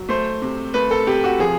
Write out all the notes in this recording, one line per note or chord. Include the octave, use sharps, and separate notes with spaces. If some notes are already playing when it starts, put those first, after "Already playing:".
Already playing: F#3
A3 C5
C3
A3 B4
A4
C3 G4
F#4
F3 G#4